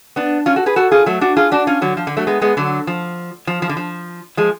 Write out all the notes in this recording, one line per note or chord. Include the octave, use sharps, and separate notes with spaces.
B3 D4
C#4 F4
F#4 A4
G#4 B4
F#4 A4
F4 G#4
F#3 A3
D4 F#4
F4 G#4
D4 F#4
C#4 F4
D3 F#3
F3
D3
F#3 A3
G#3 B3
G#3 B3
D3 F#3
F3
F3
F3
D3
F3
F3 G#3